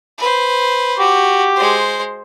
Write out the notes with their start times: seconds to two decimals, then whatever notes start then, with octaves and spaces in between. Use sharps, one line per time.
0.18 B4 C5
0.99 F#4 G4 D6
1.56 G#3 C5